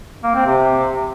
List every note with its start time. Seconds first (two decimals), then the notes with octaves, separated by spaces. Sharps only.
0.23 A#3
0.35 C4
0.46 C3